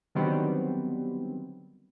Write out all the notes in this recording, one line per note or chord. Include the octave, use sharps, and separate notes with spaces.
D3 D#3 F#3 G3 B3 C4